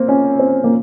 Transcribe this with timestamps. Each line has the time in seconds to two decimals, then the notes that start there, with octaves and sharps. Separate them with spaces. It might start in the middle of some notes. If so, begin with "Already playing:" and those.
Already playing: A#3 C4
0.08 C#4
0.39 C4
0.64 A#3